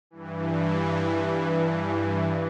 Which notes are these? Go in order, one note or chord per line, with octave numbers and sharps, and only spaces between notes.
G2 E3